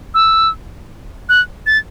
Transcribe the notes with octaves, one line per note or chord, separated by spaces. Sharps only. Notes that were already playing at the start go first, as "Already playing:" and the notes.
E6
F#6
A6